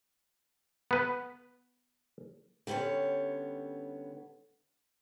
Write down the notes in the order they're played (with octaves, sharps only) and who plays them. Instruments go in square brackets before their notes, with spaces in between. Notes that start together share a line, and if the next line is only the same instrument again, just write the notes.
[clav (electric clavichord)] B3 B4
[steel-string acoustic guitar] D3 G3 B3 C#4 C#5